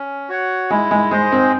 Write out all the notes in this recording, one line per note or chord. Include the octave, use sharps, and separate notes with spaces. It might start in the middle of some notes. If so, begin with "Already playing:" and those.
Already playing: C#4
F#4 C#5 F#5
G#3 E4
G#3
G#3 G#4 C5 D#5
C4